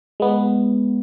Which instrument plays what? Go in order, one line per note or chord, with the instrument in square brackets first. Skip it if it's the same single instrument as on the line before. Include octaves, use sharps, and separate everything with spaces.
[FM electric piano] G#3 B3